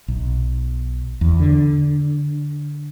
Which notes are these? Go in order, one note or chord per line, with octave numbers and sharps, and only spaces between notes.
B1
E2
D3